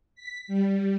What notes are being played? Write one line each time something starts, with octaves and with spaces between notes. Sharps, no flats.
B6
G3